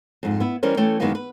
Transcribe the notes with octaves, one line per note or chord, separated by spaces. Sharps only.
F2 G#2
B3 E4
E3 G3 C#4 A#4 C5
E3 A3 C#4 A4 G5
F#2 D#3 E3 G#3 A#3 B3
B4